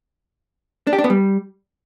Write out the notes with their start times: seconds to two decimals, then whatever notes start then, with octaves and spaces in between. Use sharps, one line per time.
0.87 D4
0.93 G4
0.98 D4
1.04 B3
1.10 G3